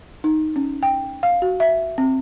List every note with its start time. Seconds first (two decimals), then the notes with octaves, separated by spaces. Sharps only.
0.24 D#4
0.56 C#4
0.83 G5
1.23 F5
1.42 F#4
1.60 E5
1.98 C4